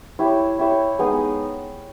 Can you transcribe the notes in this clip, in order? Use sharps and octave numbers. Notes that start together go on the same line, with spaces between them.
E4 G4 C#5 E5
E4 G4 C#5 E5
G#3 B3 D#4